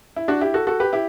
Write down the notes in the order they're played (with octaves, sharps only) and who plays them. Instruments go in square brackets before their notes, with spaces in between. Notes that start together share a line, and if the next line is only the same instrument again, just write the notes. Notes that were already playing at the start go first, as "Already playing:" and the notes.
[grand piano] E4
D4 F#4
E4 G4
F#4 A4
F#4 A4
G4 B4
E4 G4